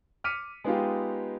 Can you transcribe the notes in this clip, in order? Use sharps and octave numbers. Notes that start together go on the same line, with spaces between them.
D6 F6 B6 C#7 D#7
G#3 B3 D#4 F4 G4